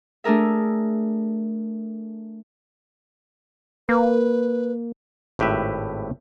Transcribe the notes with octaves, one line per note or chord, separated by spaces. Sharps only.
A3 D4 G#4 A#4 E5
A#3 B4
G#1 A2 G4 B4 E5